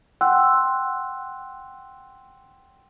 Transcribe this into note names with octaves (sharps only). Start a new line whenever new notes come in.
F#5 G5 C6 E6 F#6